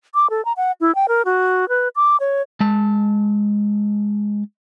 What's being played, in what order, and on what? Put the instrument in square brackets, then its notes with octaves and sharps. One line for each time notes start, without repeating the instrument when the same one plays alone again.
[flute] D6
A4
A#5
F#5
E4
G5
A#4
F#4
B4
D6
C#5
[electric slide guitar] G#3 A5